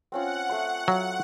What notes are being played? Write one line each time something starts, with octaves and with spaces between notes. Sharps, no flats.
C4 C#4 F4 F#5
A3 G#5 C6
F#3 F5